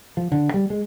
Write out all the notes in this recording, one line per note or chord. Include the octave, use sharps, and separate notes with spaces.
F3
D3
G3
G#3